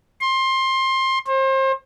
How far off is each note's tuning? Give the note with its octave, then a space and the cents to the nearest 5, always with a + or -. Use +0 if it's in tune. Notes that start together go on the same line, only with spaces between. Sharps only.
C6 +20
C5 +35